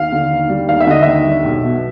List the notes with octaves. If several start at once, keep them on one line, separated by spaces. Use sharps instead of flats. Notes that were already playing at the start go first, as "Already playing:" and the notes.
Already playing: D#2 F5
D3
D#2
G3
D#2 F5
E5
D3 D#5
D#2 E5
G3
B1
B2